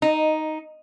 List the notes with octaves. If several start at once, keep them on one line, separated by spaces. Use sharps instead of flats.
D#4